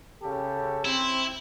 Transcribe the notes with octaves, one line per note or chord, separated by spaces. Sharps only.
C#3 G4 A4
C4 E4